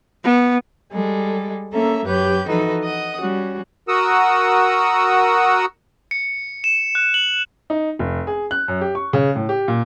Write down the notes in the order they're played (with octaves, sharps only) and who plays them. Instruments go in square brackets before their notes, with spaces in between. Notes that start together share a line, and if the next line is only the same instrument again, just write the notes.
[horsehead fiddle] B3
[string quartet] G3 G#3 A4
A#3 C#4 A4 E5 A#5
F#2 G4 B4 C#5 G6
E3 F3 D#4 F#4 A4 B4
D#5 F#5 D#6
G3 C#4 F#4
[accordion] F#4 A#4 F#5 D#6 E6
[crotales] C#7
E7
F#6
F#7
[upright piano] D#4
F1
G#4
F#6
F#2
G4
C#6
C#3
A2
G4
A#2